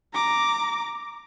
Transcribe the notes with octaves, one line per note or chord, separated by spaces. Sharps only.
A#5 D6